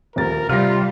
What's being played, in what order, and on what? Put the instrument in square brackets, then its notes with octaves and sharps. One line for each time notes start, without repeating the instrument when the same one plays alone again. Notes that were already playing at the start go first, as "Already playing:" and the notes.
[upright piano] D#1 D2 A6 [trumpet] A#4
[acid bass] C3 [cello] G3 [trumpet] F4 [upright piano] F6 A#6